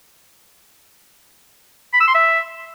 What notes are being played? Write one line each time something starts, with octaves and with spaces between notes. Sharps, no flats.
B5
E6
C6
E5